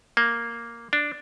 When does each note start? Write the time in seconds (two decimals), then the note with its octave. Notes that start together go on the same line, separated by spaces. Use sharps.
0.17 A#3
0.93 D4